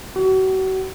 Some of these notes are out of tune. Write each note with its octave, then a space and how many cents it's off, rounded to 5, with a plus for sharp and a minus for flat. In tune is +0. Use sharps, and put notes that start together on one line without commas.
F#4 +35